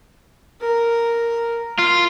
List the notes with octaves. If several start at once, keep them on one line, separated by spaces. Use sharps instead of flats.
A#4
F4